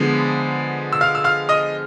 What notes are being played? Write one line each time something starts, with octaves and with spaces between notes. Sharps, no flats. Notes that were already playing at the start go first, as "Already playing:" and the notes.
Already playing: D3 F3 G#3 B3
E6
F5 F6
E6
F5 F6
D#5 D#6